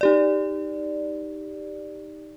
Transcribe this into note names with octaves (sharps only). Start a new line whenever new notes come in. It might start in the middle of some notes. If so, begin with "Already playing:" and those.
D#4 G4 D5